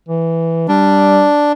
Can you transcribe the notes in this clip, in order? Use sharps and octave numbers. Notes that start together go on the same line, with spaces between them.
E3
G3 D4